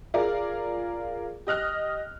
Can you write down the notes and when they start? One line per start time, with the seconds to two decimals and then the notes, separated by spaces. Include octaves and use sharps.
0.14 F4 G#4 A#4 D5 F5
1.47 G4 D#5 F6 F#6